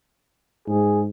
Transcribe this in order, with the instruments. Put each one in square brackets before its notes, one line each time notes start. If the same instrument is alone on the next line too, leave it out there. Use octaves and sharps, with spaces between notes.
[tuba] G#2 [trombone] G#4